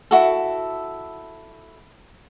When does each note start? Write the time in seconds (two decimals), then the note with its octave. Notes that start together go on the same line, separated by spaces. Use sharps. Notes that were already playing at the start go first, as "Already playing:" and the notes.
0.11 E4 F#4 A4